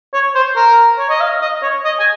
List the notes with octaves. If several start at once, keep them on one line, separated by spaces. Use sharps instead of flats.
C#5
C5
A#4
C#5
D#5
F5
D#5
C#5
D#5
G#5